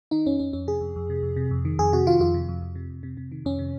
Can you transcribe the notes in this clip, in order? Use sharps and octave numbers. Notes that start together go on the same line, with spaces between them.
D#3 D#4
F2 C#4
F2 C#4
F2 C#4
C3 G#4
F2
F2
C3
F2
C3
F2
D#3
F2 G#4
C3 F#4
D#3 F4
F2 F4
C3
F2
F2
C3
F2
C3
C3
D#3
F2 C#4
C3